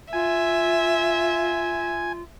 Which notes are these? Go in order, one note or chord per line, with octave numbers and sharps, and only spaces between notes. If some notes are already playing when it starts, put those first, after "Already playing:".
F4 E5 G#5